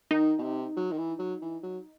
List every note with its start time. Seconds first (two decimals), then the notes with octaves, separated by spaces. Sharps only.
0.11 D#3 D#4
0.38 B2
0.43 C3
0.76 F#3
0.92 D#3
0.98 E3
1.19 F#3
1.42 E3
1.63 F#3